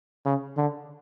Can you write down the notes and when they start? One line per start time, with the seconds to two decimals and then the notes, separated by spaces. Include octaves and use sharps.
0.25 C#3
0.57 D3